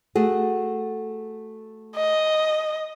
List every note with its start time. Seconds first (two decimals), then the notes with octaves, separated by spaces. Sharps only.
0.15 A3 F#4 G#4
1.96 D#5